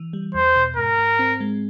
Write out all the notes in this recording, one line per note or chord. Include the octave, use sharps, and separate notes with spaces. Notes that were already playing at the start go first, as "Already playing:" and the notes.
Already playing: E3
G3
E2 C5
B2
G#2 A#4
G#2
C4
G#3